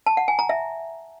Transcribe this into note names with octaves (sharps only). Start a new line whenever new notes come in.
A5
F#5
G#5
A#5
E5